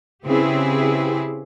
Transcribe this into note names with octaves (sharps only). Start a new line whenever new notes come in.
C#3 C4 E4 G4 G#4 B4